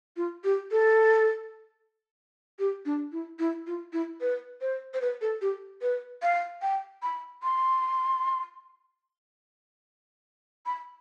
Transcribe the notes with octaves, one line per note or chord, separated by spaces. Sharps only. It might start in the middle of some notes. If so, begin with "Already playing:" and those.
F4
G4
A4
G4
D4
E4
E4
F4
E4
B4
C5
C5
B4
A4
G4
B4
F5
G5
B5
C6
B5